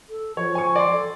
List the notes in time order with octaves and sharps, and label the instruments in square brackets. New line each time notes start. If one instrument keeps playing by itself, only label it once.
[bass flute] A4
[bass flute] F3 [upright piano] C#5
[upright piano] G#5 C#6
D5 C6
[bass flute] A4